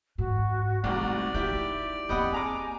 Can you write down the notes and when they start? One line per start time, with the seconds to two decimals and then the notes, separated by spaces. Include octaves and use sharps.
0.18 G#2 F#4
0.84 C2 G#2 A3 D5
1.34 D#4 E4 G4
2.09 A#3 C4 G4 D#5 F#5 B5
2.32 G#4 G#5 A#5 D6